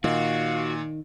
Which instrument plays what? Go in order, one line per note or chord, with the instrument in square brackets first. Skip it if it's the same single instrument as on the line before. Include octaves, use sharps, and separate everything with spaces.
[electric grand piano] A#2 [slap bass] D#3 [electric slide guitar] F#4 [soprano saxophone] F5